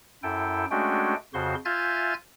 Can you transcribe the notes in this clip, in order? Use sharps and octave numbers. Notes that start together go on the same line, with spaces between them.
F#2 E4 A4 G5
G#3 A3 C#4 D4 F#4 G5
F2 C#3 F#4 C5 C6
F4 E5 G#5 F6 G6 A6